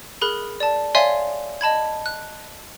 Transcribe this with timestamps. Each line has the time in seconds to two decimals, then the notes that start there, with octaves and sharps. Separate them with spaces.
0.22 G#4 A#4 B5 F#6
0.60 D5 A5
0.95 C#5 D5 E5 F5 G#5 C6
1.61 D#5 A5 B5 G#6
2.06 F#6